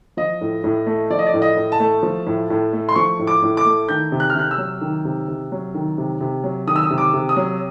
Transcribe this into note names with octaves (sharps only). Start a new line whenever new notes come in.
F3 D#5
A2
A2
A3
F3 D5
D#5
D5
A2
D#5
A2
A5
A3
F3
A2
A2
A3
C6
F3 C#6
A2
D6
A2
D6
A3
D#3 G6
C3
F#6
F6
C3 F#6
E6
F#3
D#3
C3
C3
F#3
D#3
C3
C3
F#3
D#3 D#6
E6
D#6
C3
D6
C3
D#6
F#3